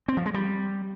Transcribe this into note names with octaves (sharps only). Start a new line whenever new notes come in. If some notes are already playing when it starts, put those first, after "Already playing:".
C4
F3
G#3
G3